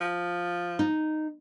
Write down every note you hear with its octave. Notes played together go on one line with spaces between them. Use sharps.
F3
D#4